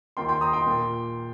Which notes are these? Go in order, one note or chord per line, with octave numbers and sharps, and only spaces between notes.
D#2 D#3 A#3 F4 G5 C6
G5 C6
A#5 D#6
G5 C6
A#2 A#3